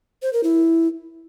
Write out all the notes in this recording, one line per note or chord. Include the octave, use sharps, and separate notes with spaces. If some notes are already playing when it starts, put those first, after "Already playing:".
C5
A#4
E4